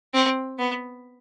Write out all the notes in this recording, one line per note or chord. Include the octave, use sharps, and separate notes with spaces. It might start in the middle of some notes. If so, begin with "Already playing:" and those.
C4
B3